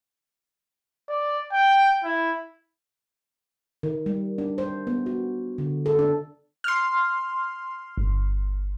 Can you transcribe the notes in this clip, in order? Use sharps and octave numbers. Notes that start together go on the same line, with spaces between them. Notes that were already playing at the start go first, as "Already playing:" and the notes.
D5
G5
E4
D#3
G3
D4
C5
B3
F#4
D3
A4
D4
C6 F6
G1